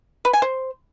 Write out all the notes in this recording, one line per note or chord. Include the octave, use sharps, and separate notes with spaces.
B4
G#5
C5